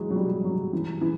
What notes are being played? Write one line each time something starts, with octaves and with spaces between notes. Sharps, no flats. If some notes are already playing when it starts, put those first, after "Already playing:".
Already playing: E3 F#3 G#3
F#3
G3
F#3
E3
E3